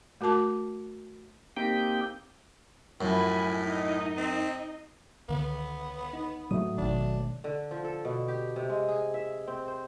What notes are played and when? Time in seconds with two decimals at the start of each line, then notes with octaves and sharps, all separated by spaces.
0.21 A3 F#4 A#4 A5 D6
1.57 A#3 C4 D#4 G4 G5
3.01 F#2 A2 F3 G#5 B5
3.55 D#4 D#5
4.17 C4
5.29 C#2 D3 D#3 B3
6.13 D#4
6.51 A2 F#3 A3 D#6
6.78 D1 G#1 B2 D#3 D4
7.44 D3
7.71 F3
7.84 A4
8.05 B2
8.28 G4
8.56 C3
8.69 G#3
8.88 G#4
9.14 E5
9.47 C4
9.68 C5